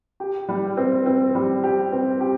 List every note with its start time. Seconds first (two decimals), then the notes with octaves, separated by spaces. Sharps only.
0.20 G4
0.49 G3
0.77 C4
1.06 C4
1.35 G3
1.64 G4
1.92 C4
2.21 G4